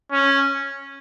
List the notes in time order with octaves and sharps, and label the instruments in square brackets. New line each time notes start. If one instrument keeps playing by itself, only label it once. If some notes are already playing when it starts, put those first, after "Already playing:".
[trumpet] C#4